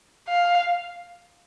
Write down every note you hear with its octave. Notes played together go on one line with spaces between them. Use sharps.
F5